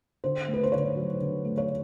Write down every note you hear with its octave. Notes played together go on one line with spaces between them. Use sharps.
D3 C5
A3
B4
C5
D3 C#5
F#3
D3
A3
C#5